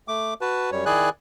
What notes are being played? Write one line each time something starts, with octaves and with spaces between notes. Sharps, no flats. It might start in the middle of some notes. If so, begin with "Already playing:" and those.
A3 D6
F#4 B4 A5
F#2 G3 C#5
D#3 E4 G#4 D5 G#5 F#6